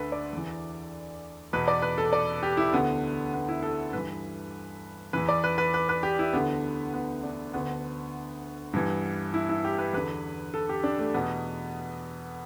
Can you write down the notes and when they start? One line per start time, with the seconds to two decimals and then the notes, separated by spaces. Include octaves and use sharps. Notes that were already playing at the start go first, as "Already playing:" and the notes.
Already playing: D2 D3 A4 B4
0.12 D5
0.33 E2 E3
1.53 E2 B2 B4
1.68 D5
1.82 B4
1.98 A4
2.13 D5
2.43 G4
2.57 E4
2.72 D2 D3 B3
3.34 B3
3.49 E4
3.62 A4
3.93 G2 E3 B4
5.13 E2 E3 B4
5.29 D5
5.44 B4
5.58 B4
5.74 B4
5.89 B4
6.03 G4
6.19 E4
6.33 D2 D3 B3
6.94 B3
7.23 D4
7.53 D2 D3 B3
8.73 G2 E3
9.34 E4
9.49 E4
9.65 G4
9.78 B4
9.93 E2 D3 B4
10.54 A4
10.69 G4
10.84 D4
10.99 A3
11.14 E2 B2 B3